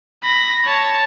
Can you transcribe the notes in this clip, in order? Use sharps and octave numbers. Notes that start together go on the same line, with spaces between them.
B5 A#6
C#5 A5